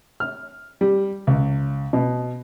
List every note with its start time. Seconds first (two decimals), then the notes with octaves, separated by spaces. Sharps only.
0.20 F6
0.81 G3
1.27 C#2
1.93 B2